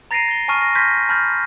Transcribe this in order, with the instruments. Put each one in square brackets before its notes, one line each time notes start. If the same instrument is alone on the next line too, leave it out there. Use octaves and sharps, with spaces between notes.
[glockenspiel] A#5 A6 A#6 C7 D7 D#7
A6 G7
G#5 A5 C#6 F6 D#7
A#6
C6 F6 G6 G#6 A#6 B6
A5 B5 F6 G6 A6